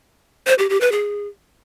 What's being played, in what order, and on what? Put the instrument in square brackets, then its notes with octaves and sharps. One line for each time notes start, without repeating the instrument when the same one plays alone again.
[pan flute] C5
G4
G4
B4
G#4